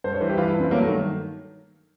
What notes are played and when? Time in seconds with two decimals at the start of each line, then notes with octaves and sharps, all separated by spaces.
0.04 G2 C5
0.12 C#5
0.21 E3 C5
0.29 G4
0.38 E3 F4
0.49 E4
0.54 G2
0.60 C4
0.71 F#3 A#3
0.82 A3
0.88 D#3